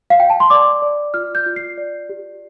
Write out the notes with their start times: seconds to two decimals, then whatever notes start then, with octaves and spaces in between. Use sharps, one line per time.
0.10 F5
0.20 G5
0.30 A5
0.40 C6
0.50 D5 D6
0.82 D5
1.14 F4 F6
1.35 G6
1.46 F4
1.56 C7
1.78 D5
2.09 G4